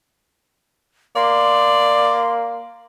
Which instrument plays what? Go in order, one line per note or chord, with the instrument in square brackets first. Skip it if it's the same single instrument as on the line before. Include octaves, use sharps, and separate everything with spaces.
[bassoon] A#3 [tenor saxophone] D5 [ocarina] C6